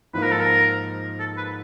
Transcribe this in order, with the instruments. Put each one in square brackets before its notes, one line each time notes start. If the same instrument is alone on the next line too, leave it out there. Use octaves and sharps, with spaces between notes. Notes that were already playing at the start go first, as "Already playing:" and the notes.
[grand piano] G#2 F3 A#3 D#4 [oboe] B4
[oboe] A#4
A4
A#4
A4
B4